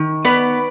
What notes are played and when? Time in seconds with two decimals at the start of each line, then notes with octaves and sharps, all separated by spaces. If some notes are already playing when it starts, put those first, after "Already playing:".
Already playing: D#3
0.25 B3 B4 D5